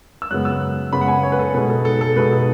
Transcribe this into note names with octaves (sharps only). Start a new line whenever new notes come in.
E6
F#2 C#3 G#3 B3 F#6
E6
F#2 C#3 G#3 B3 B5
F#5
G#5
C#5
B4
A4
B2 G#3 D#4 B4
A4
A4
A4
B2 G#3 D#4 B4
A4